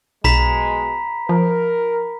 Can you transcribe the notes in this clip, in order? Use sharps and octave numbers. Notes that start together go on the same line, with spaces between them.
B1 B2 G#3 A#5 B5 B6
F3 A#4